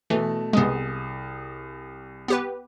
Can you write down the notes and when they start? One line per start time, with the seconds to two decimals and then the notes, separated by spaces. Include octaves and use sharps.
0.10 B2 E3 A3
0.53 C2 G#3 B3 G#4 D#6
2.28 B3 G4 B4